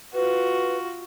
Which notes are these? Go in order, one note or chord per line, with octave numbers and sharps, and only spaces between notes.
F4 F#4 B4